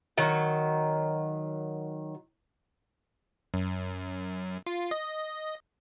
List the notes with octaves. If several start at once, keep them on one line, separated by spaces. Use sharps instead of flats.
D#3 F#3
F#2
F4
D#5